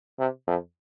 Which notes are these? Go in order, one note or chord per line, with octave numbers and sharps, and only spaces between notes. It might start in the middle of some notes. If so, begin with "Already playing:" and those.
C3
F2